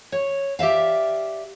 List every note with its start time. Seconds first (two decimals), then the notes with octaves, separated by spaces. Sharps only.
0.12 C#5
0.59 G4 D5 E5 F5